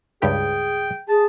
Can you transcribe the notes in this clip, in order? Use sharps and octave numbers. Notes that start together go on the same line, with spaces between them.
C#2 G2 G4 G#4 G5
G#4 A5